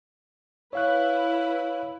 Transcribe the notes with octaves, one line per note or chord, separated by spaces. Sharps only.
E4 B4 C#5 F5 B5 F#6